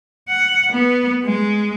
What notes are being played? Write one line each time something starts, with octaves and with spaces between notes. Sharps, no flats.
F#5
B3
G#3